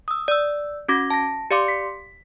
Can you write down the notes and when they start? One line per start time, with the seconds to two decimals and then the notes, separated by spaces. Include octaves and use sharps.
0.08 D#6 E6
0.28 D5 E6
0.88 C#4 F#4 D6 G#6 A#6
1.10 A5 A#6
1.51 G4 D5 F5 C6 D6 C#7
1.68 B6